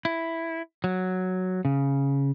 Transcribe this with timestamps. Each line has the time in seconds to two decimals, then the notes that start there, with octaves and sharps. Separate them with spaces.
0.05 E4
0.84 F#3
1.65 C#3